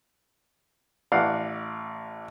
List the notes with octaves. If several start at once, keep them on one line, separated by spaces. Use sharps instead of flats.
A1 D5 F5 F#5